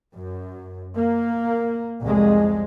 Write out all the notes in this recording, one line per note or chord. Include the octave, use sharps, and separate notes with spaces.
F#2
A#3
C2 F2 G#3